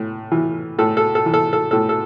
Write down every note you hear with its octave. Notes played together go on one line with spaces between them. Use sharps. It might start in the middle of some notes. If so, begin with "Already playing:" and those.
Already playing: A2
E3
A2 A4
A4
A4
E3
A4
A4
A2 A4
A4